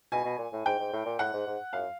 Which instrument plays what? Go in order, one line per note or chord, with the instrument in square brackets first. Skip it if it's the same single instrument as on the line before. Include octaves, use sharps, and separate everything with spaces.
[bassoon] B2 [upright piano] G#5
[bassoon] B2
A#2
A2
[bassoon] G#2 [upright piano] G5
[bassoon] G#2
A2
A#2
[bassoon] A2 [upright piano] F#5
[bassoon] G#2
G#2
[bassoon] F#2 [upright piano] F5